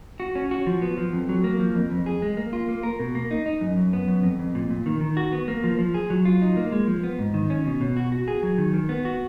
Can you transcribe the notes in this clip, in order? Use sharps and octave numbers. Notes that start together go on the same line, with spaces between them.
F#4
C#4
F#4
F3
B3
F3
F2
F#3
A#3
F3
F2
F2
G#4
G#3
A#3
F4
A#3
A#4
B2
A#3
D#4
D#4
F#2
F#2
B3
F#2
F2
F2
A#2
A#2
D#3
D#3
F#4
B3
A#3
F3
F3
G#4
F#3
F4
D#4
A#3
G#3
F3
B3
G#2
D#3
C#4
B2
B2
F#4
F#4
G#4
F#3
D#3
D#3
B3
F#4